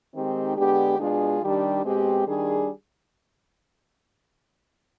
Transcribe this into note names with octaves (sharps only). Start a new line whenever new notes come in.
D#3 G#3 C4 D#4 G4
D3 G#3 B3 D4 G4
B2 G#3 D4 F4 G#4
D#3 G3 D4 G4
B2 G#3 C4 G4
D#3 G3 D4 G#4